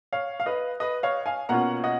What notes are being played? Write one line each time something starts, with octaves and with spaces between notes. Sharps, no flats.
C#5 F5
F5
B4 D#5
B4 D#5
C#5 F5
F5 G#5
B2 A#3 C#4 F4 F#5 A#5
D#5 F#5